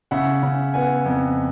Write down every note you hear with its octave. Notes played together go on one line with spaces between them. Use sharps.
C#3 E5 F#5
C#3
B3 F#5 G#5
F2